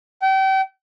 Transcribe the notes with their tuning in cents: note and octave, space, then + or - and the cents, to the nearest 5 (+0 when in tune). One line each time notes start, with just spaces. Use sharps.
G5 -35